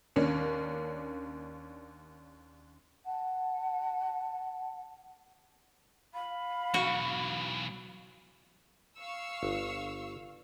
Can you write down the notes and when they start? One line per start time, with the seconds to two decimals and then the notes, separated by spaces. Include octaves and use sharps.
0.16 D#2 A#3 C#4 D4
3.04 F#5 A5
6.14 F5 B5
6.74 B1 E3 F#4
8.97 F5 C#6 E6
9.43 G1